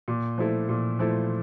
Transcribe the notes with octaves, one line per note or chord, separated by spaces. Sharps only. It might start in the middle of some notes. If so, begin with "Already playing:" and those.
A#2
F3 A3 E4
A#2
F3 A3 E4